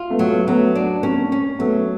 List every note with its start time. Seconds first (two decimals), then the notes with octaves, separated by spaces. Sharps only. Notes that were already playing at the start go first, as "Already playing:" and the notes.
Already playing: F4
0.10 A3 B3
0.19 F#3
0.29 A3 B3
0.48 F#3 A3 B3
0.75 D4
1.03 A#3 C4 C#4
1.32 C#4
1.59 F#3 A3 B3